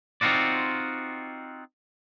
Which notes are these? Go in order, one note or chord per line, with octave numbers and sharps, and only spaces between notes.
C4 D#4 F4 F#4 D5